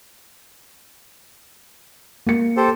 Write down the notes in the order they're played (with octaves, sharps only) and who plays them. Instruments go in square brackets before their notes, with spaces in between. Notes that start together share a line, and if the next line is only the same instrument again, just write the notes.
[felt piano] A#3 C#7
[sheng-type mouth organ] G4 A4 C5